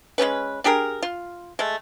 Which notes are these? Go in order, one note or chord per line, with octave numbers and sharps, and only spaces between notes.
G#3 A3 C#4 B4
D4 G4 G#4 A#4
F4
G#3 A3